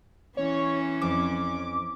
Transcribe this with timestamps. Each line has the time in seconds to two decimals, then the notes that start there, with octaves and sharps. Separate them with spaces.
0.37 E3 C#4 C#5
1.01 F2 D6